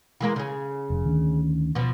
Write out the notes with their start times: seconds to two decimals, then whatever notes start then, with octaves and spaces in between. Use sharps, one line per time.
0.21 E3 G#3 A#3
0.36 C#3 G#4
0.90 F1
1.05 D2 D#3 C#4
1.75 B2 F3